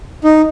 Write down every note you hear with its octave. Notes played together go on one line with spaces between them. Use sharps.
D#4